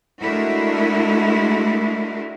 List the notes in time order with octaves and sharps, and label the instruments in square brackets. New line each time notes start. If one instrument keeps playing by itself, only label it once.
[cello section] G#3 A3 D4 E4 F#4 A#4